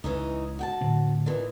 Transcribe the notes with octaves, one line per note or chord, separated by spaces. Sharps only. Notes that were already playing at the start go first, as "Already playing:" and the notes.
C#2 E3 C#4 D#4
F#4 G5 A5
A2 D3 C4
A#2 D#3 E3